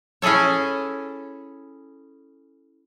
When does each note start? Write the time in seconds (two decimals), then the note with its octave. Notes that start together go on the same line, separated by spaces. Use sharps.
0.22 C#4 E4 G#4 A4 C#5